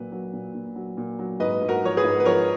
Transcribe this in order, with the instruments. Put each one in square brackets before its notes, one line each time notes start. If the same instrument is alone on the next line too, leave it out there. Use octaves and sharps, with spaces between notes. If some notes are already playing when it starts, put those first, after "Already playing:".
Already playing: [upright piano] A#2 F#3 B4
F#3
A#2
A#2
F#3
A#2
F#3
G#2 B4 D#5
G#2
F#4 A#4
F3 C#5
G#4 B4
G#2
B4
F3 A#4 C#5